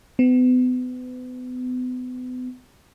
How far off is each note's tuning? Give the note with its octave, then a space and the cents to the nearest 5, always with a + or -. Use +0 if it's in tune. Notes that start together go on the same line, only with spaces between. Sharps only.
B3 +35